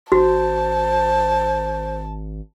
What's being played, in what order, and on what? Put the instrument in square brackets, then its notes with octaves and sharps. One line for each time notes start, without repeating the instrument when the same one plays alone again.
[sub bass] G#1 [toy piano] F#4 [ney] C5 [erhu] A5